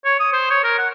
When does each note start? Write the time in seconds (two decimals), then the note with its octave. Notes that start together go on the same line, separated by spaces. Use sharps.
0.05 C#5
0.19 D#6
0.33 C5
0.50 C#5
0.64 A#4
0.78 F#5